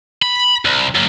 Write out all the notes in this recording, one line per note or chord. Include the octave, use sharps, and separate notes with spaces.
B5
C2
F#2 A#3